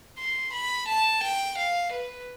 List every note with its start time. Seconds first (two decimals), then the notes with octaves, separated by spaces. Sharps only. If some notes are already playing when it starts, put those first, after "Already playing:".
0.19 C6
0.53 B5
0.88 A5
1.23 G5
1.58 F5
1.92 B4